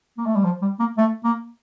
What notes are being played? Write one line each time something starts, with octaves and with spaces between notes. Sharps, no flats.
A#3
A3
G3
F3
G3
A#3
A3
A#3